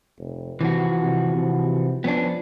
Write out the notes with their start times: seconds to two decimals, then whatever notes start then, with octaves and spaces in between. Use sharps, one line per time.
0.19 F1
0.61 C3 E3 F3 F#4
1.02 C3
1.35 C3
2.04 F3 B3 C#4 D4